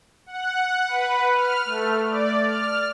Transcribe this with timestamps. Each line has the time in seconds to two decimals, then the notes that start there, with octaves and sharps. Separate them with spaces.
0.26 F#5
0.87 B4
1.34 F6
1.65 A3
2.09 D5
2.46 F6